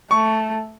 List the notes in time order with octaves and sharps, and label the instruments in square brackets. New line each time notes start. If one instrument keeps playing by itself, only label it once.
[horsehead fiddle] A3 [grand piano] C#6